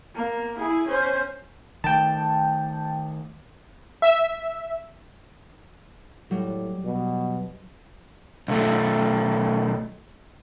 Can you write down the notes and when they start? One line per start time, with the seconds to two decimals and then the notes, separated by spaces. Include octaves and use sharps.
0.15 A#3
0.57 E4 G#4
0.87 C#4 C5
1.84 D#3 A3 G5 A5
4.02 E5
6.31 A2 F#3 G3
6.85 B2
8.48 B1 A3